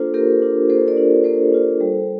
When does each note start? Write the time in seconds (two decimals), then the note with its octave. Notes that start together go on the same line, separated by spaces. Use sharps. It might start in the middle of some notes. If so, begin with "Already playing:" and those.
Already playing: A#3 D4 F4 A4 C5
0.14 A#3 G4 A#4
0.42 D4 F4
0.69 A#3 A4 C5
0.87 A#4 D5
0.97 D4 F4
1.24 A#3 A4 C5
1.52 D4 F4
1.81 G3